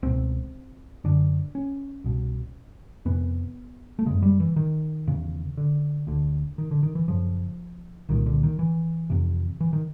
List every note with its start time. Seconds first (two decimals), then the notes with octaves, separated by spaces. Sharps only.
0.03 C#2 B2 C4
1.04 F#2 D3 D4
1.55 C#4
2.04 C2 B2
3.05 F2 C3 B3
3.99 A3
4.06 F#2 C#3 G#3
4.23 G3
4.40 E3
4.56 D#3
5.07 E2 C#3
5.57 D3
6.07 D2 D3
6.58 D#3
6.71 D3
6.83 D#3
6.95 E3
7.08 F#2 C#3 F3
8.09 C2 A#2 D#3
8.26 D3
8.43 D#3
8.59 E3
9.10 F2 C3
9.61 E3
9.73 D#3